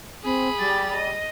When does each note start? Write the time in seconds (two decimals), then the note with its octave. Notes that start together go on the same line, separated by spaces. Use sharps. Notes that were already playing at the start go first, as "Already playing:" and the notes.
0.24 C4 G#4 B5
0.59 G3 G4 A6
0.94 D#5